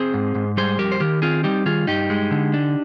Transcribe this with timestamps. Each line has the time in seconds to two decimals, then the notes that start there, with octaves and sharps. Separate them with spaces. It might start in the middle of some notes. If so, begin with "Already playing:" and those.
Already playing: C4 G#4 C5
0.14 G#2
0.35 G#2
0.57 G3 G#4 C5
0.79 F2 G4 A#4
0.92 C5
1.00 D#3 G4 A#4
1.22 C4 F4 G#4
1.44 G3 D#4 G4
1.66 D#3 F4 G#4
1.87 G2 D#4 G4
2.10 G#3
2.31 D3
2.54 D4